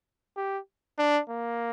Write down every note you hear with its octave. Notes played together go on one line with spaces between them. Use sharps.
G4
D4
A#3